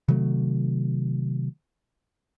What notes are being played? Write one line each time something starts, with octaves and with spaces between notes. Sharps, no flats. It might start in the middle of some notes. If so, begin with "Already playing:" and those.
C3 D#3 F#3 A3